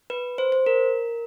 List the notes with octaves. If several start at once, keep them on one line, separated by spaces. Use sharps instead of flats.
B4
C5
C5
A#4